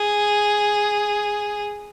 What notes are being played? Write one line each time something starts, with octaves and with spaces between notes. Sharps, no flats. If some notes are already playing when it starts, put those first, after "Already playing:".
Already playing: G#4